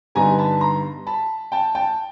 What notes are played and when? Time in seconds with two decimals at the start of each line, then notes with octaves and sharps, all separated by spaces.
0.15 G2 D3 G3 B3 D#4 G#5 A#5
0.38 A5 B5
0.61 A#5 C6
1.07 A5 B5
1.52 G5 A5
1.75 G5 A5